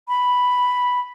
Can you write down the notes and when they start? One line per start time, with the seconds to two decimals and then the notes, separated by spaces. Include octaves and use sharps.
0.08 B5